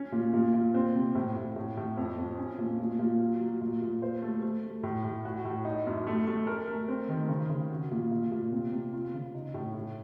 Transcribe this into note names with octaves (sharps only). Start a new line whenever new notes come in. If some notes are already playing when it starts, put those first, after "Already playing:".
Already playing: C#4
A#2
A#2
A#2
C4
C3
A2
A2
A2
A2
F2
F2
C#4
A#2
A#2
A#2
F#3
F#3
A#2
A#2
C5
A3
A3
A3
A2
A2
F#4
A2
D#4
F#2
A3
A3
A#4
A3
C4
D#3
C#3
C#3
F#4
A#2
A#2
A#2
C3
C3
F4
C#3
D#4
A2
A2